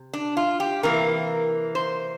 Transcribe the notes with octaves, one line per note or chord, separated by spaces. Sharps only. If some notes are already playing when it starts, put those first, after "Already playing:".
Already playing: C3
D4
F4
G4
C3 E3 A#3 A#4
C5